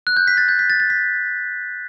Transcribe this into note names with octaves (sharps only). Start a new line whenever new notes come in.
F#6
G6
B6
A6
G6
B6
A6
A6
B6